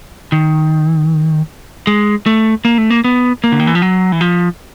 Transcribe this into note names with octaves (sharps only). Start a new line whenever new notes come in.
D#3
G#3
A3
A#3
A3
A#3
B3
A#3
D3
D#3
E3
F3
F#3
E3
F3